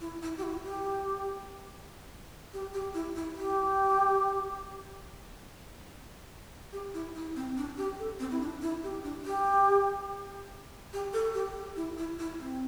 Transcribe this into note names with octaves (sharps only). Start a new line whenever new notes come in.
E4
E4
G4
E4
G4
G4
G4
E4
E4
G4
G4
E4
E4
C4
D4
G4
A4
C4
E4
D4
E4
G4
D4
G4
G4
A4
G4
G4
E4
E4
E4
C4